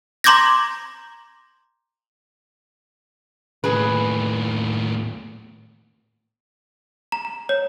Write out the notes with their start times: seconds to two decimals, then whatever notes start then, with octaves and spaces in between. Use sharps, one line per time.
0.24 A#5 C6 D6 G6 G#6 A#6
3.64 D#2 A2 G#4 B4
7.12 A#5
7.25 A#5
7.49 C#5